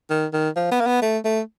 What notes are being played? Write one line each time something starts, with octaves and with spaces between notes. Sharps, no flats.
D#3
D#3
F3
B3
A#3
B3
A3
A3